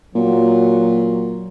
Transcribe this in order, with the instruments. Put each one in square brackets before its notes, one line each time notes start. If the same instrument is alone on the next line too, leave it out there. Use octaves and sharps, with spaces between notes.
[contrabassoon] A#2 [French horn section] F#3